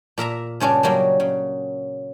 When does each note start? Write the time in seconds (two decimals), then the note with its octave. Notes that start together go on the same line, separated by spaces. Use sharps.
0.18 A#2 A#4 E5 A#5
0.60 G2 C#3 C#4 D4
0.83 C#3 F#3 G3 A#3
1.20 C#3